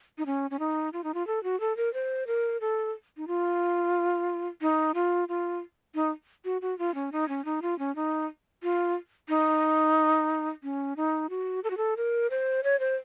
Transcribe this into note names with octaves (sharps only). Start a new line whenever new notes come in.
D#4
C#4
C#4
D#4
F4
D#4
F4
A4
F#4
A4
A#4
C5
A#4
A4
D#4
F4
D#4
F4
F4
D#4
F#4
F#4
F4
C#4
D#4
C#4
D#4
F4
C#4
D#4
F4
D#4
C#4
D#4
F#4
A4
F#4
A4
A#4
C5
C#5
C5